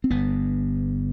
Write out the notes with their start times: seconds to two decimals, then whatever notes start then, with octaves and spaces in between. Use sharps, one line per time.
0.04 C4
0.10 G1 G2 B3